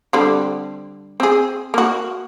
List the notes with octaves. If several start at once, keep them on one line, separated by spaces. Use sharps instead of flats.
D3 G3 C4
C4 G#4
A#3 F#4